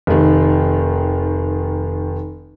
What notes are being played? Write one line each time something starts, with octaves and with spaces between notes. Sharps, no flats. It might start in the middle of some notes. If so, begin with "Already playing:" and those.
F1 D#3